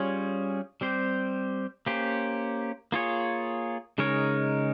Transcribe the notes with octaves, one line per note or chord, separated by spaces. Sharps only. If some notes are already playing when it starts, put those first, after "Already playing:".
Already playing: G3 C#4 F4 G#4 C#5
G3 C4 G4 C5
A#3 C#4 G4 C5
A#3 F4 G#4 C#5
C#3 G#3 D#4 A#4 C#5